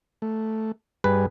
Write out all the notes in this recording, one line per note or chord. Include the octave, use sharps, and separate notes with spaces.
A3
G2 G3 G#4 B4